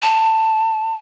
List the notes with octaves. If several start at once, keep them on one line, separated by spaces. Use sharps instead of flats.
A5